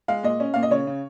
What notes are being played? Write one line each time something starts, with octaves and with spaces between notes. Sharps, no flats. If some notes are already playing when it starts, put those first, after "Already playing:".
G#3 F5
A#2 D#5
C#4
A#2 F5
D#5
C#3 C#5
C#3